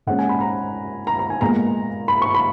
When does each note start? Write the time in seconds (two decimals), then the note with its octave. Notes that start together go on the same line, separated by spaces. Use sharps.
0.07 A#2 G#3 C#4 F#5
0.19 G#5
0.29 B5
0.41 A#5
1.07 A#5
1.19 A#5
1.30 G#5
1.41 A#2 G#3 B3 A#5
2.08 B5
2.22 C#6
2.35 B5